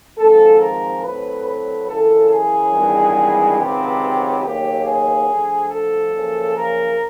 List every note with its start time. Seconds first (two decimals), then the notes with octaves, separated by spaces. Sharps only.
0.18 G#1 G#2 F3 A4
0.60 A#4
1.02 A2 F#3 A3 C4 B4
1.45 B4
1.88 F#2 C#3 E3 A4
2.30 G#4
2.72 G#1 G2 E3 G#3 B3
3.57 C#2 C3 D#3 F#3 B3 G4
4.42 D#2 C#3 F#3 B3 G4
4.85 G#4
5.28 D2 D3 F3
5.70 A4
6.13 F#2 C#3 F3 A#3
6.56 A#4